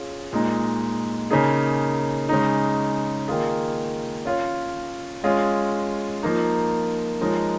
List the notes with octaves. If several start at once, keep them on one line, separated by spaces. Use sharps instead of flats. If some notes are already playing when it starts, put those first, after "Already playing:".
Already playing: C#4 F4 G#4
A#2 G#3 D#4
C#3 A#3 D#4 G#4
C#3 G#3 D#4
D#3 A#3 F4 G#4
C#4 F4 C#5
G#3 C#4 F4 G#4
F3 A#3 D#4
F3 G#3 D#4 A#4 C#5